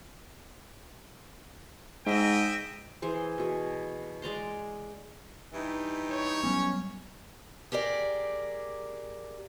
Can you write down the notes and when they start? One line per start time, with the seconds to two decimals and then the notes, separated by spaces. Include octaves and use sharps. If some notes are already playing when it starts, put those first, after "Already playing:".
2.06 G#2 D#5 E5 G5
3.02 E3 G#4 C5
3.38 B2 G#4
4.22 G#3 D5 A#5 C6
5.54 G2 E3 D#4 G4
6.10 C#5
6.43 F#3 G3 B3 C#4
7.72 G4 G#4 A#4 D5